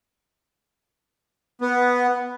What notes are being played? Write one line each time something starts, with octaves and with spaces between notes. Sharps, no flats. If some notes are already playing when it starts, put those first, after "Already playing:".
B3